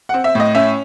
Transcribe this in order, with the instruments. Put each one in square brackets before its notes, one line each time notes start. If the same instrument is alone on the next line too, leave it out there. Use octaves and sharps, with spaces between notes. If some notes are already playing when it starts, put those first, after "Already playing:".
[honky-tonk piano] C4 F#5
E5
A2 D#5
C#4 E5